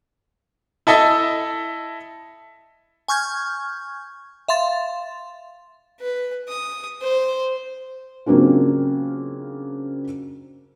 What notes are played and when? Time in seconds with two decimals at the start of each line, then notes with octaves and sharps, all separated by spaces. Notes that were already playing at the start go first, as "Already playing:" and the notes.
0.87 E4 A4 D#5 E5 A5
3.08 G#5 C#6 F6 G6 G#6
4.48 E5 F5 C6 A6
6.01 B4
6.48 D#6
7.01 C5
8.26 C#3 F#3 A#3 C4 D4 F4